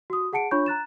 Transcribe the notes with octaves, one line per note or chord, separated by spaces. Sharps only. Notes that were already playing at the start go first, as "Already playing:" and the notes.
F#4 D#6
G#4 F#5 A5 C#7 D7
D4 F4 C#5 B5 C#6 G6
A#5 F#6 A6 E7